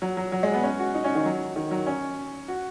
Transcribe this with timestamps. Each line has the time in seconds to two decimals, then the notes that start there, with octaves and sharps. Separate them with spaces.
0.02 F#3
0.17 F#3
0.32 F#3
0.43 G#3
0.54 B3
0.63 C#4
0.79 F#4
0.95 D#4
1.04 C#4
1.15 D#3
1.26 F#3
1.56 D#3
1.71 F#3
1.86 C#4
2.48 F#4